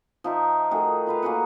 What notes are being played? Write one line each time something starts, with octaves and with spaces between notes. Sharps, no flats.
F3 D#4 E5
D#3 A3 F#4 G#4
F4 B4 F5
A#3 F#4 G#4 F#5